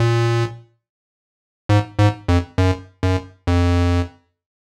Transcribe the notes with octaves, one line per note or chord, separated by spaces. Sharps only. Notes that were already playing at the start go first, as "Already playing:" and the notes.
Already playing: A#2
G#2
G#2
F2
F#2
F#2
F2